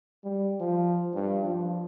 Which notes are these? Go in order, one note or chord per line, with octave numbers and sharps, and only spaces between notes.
G3
F3
G2
F3